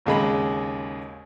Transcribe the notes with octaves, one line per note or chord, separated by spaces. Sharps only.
G#1 D#2 C#3 G#3 G#4 B5